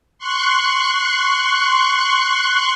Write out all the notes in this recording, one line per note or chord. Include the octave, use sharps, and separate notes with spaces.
C6 C#6 F#6